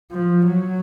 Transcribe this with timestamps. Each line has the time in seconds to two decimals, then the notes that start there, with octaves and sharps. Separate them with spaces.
0.11 F3
0.47 F#3